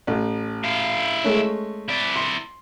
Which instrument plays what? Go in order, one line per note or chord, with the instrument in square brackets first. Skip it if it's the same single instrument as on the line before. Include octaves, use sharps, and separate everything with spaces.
[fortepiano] A1
[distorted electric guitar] E4 F5
[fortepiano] G#3 A3 C#4
[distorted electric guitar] E4 D5
[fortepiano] C6